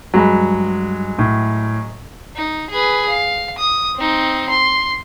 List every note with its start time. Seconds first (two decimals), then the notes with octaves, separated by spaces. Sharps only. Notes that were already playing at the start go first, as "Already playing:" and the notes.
0.14 G2 F#3 G#3 B5
1.19 A2
2.36 D#4
2.70 G#4 B4
3.09 F5
3.58 D#6
3.96 C4 D#4
4.50 C6